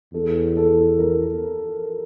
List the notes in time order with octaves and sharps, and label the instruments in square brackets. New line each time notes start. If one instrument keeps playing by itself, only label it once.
[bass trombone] E2 [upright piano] A4
[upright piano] A4
A#4